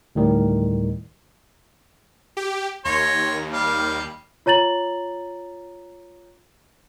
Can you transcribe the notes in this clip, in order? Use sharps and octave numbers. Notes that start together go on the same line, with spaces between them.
D2 A2 D#3 G3
G4
D#2 C#5 A#5 C6
G3 F5
F4 C#5 A#5 A6 F#7